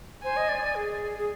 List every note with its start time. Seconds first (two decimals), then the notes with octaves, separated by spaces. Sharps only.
0.23 C5 G#5
0.37 D#5
0.49 D5
0.62 D5
0.75 G#4
1.18 G#4